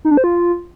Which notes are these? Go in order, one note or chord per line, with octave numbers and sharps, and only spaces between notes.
D#4
D4
C5
F4